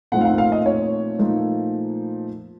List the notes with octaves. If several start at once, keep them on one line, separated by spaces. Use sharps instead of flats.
A#2 F3 A3 C4 D#4 F#5
F5
F#5
F5
D#5
C#5
A#2 F3 A3 D#4